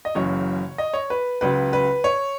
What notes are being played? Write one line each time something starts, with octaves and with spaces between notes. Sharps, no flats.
D#5
F#1 F#2 C#3 E3 C#5
D#5
C#5
B4
C#2 C#3 F#3 B4
B4
C#5